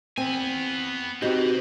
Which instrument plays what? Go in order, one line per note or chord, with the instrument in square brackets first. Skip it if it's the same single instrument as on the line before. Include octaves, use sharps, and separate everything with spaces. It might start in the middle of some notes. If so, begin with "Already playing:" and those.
[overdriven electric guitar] B3 G#5 [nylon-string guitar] C4
[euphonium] C4 [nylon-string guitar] D#4 [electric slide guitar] F#4 G4 [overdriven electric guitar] B4 D#5